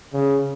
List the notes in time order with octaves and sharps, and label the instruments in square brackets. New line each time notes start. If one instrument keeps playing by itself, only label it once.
[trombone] C#3